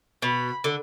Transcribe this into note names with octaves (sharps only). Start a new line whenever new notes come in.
B2 B5
D3